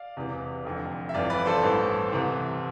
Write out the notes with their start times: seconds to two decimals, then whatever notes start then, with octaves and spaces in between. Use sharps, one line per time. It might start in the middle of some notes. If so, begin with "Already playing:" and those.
Already playing: D5 F5
0.17 E1 E2 C3 E3
0.64 F1 F2 D3
1.09 E5
1.14 G1 F2 E3 D5 F5
1.30 B4 D5
1.46 A4 C5
1.63 A1 G2 E3
2.12 C2 C3 E3